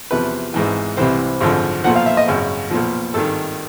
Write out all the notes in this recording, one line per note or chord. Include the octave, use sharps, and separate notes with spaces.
E2 C3 F3 B4
G#1 G#2 E3
C2 C3 E3 C5
G#1 F#2 D3 F3
B1 A#2 F3 F#5
F5
E5
D#5
G#1 F#2 C#3
B1 A#2 F3
G#1 G2 D#3 A4